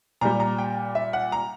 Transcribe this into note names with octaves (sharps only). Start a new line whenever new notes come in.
A#2 G3 A#5
A#5
G5
E5
F#5
A#5